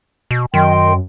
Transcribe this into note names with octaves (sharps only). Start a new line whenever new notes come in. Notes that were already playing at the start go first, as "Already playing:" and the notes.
B2
F#2 D#3 D#5 G5 C6